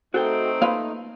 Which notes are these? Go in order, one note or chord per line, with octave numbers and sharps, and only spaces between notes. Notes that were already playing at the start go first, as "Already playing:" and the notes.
A3 C4 D#4 F#4 A4 G5
A#3 F4 B4 F5